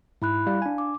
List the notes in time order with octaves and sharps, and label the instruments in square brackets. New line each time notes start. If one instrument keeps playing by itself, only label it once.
[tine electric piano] G#2 [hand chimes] E4 B5 F#6
[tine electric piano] G3 [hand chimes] F5
[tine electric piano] D4 G#5
[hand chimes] D6